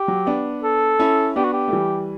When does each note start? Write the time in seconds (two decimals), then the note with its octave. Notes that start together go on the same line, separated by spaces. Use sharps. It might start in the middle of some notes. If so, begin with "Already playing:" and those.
Already playing: G4
0.08 F#3
0.26 B3 D4
0.63 A4
0.99 C#4 E4
1.36 B3 D4 G4
1.44 F#4
1.53 G4
1.68 A3
1.73 E3 G3